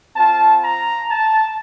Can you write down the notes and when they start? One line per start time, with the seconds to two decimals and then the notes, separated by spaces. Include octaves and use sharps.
0.15 C4 F4 A5
0.62 A#5
1.09 A5